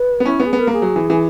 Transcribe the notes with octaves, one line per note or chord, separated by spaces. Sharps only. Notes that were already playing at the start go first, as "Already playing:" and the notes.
Already playing: B4
B3
C#4 E4
B3
G#4
B3
A#4
A#3 G#4
F#3
E3
E3